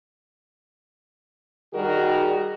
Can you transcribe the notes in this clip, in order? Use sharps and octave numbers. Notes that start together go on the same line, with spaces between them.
D#3 G3 D#4 F#4 G#4 A#4